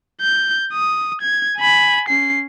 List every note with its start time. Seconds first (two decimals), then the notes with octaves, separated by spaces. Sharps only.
0.21 G6
0.73 D#6
1.21 G#6
1.57 G#5 B5
2.09 C#4 C7